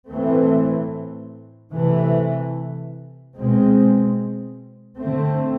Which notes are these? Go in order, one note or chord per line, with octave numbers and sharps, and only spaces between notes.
A2 E3 A3 C4
C3 E3 A3
B2 G#3 C4
D3 A3 C4